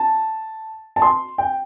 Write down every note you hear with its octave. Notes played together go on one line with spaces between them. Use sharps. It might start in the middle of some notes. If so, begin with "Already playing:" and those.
Already playing: A5
A5
C6
G5